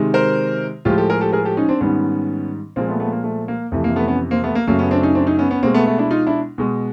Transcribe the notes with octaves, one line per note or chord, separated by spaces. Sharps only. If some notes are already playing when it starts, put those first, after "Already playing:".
Already playing: C3 D#3 G#3
A#4 C5
A2 F3 G#3 F4 G4
G4 A4
G#4 A#4
G4 A4
G#4 A#4
G4 A4
C#4 D#4
C4 D4
G#2 D#3 G3 B3 C#4
A#2 F3 G#3 A#3 C4
A3 B3
A3 B3
A#3
A3
A#3
F2 C3 E3 A3
A#3
A3 B3
B3 C#4
A#3 C4
A3 B3
A#3
F#2 C#3 F#3 A3 A#3
B3 C#4
C4 D4
C#4 D#4
C4 D4
C#4 D#4
B3 C#4
B3 C#4
B2 G#3 A#3 C4
A3 B3
A3 B3
D4 E4
D#4 F4
D4 E4
B2 G#3